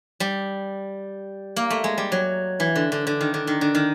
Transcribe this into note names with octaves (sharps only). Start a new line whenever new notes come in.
G3
A#3
A3
G#3
G3
F#3
E3
D3
D3
D3
D#3
D3
D#3
D3
D#3